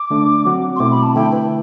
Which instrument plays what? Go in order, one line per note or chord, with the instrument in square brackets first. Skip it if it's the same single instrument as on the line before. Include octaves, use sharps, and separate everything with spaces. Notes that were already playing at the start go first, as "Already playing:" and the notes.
Already playing: [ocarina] D6
[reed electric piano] D3 A3 D4
F#3 C4 F#4
[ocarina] C6
[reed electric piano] B2 A3 C4 E4 [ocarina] D6
[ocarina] B5
A5
[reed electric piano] D3 A3 E4 [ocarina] G5
[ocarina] B4